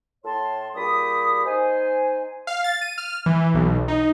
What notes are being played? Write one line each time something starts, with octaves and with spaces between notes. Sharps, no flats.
A2 C#5 A5 C6
A#2 G3 G4 G#4 B5 D#6
D#4 C5 G#5
F5
A6
D#7
F6
E3
B1
D#4